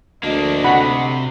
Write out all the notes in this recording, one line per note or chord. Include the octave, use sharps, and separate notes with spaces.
D2 A#3 D4 D#5
C3 F#4 F#5 B5